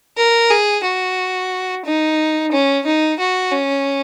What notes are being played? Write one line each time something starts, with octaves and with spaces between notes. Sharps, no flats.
A#4
G#4
F#4
D#4
C#4
D#4
F#4
C#4